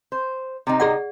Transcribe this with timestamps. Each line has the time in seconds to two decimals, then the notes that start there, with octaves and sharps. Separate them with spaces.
0.12 C5
0.67 C3 G3 D#4
0.80 G#4 D5 F#5